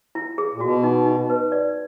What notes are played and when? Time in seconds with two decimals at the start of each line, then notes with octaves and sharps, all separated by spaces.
0.15 E4
0.38 G#4
0.54 A#2
0.61 B2 F#4
0.84 D#4
1.06 D#4
1.30 B4
1.52 D5